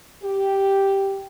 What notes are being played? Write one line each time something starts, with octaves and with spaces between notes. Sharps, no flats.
G4